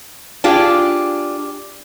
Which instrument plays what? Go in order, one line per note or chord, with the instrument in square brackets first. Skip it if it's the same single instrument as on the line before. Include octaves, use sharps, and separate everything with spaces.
[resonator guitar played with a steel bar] D4 F4 G4 G#4